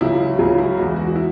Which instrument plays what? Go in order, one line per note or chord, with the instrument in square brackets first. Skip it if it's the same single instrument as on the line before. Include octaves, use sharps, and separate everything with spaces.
[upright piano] C#2 C#3 F#3 E4
C#2 C#3 F#3 C#4
E4
E2 E3 G#3 F#4
F#4
E4